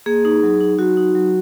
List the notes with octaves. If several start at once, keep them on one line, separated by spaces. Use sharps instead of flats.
A#3 G#4
D#4
F#3
D#4
F#3 F#4
D#4
F#3